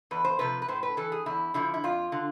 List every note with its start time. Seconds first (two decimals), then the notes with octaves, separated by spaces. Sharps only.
0.11 E2 B4
0.24 C5
0.39 C3 F3 B4
0.62 B4
0.68 A2 C5
0.83 B4
0.97 E3 A4
1.12 G#4
1.26 E2 E4
1.54 D3 F3 E4
1.74 E4
1.84 F2 F4
2.12 D3